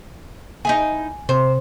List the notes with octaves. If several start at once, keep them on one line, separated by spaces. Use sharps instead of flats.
D#4 E4 G#4 G#5
C3 C5